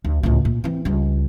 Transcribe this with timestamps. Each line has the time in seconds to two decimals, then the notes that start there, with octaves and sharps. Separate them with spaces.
0.04 D2
0.23 C#2 A2
0.45 A#2
0.64 E3 C4
0.85 C#2 G3